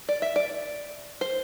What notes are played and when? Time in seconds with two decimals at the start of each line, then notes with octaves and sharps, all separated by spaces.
0.09 D5
0.22 E5
0.36 D5
1.21 C5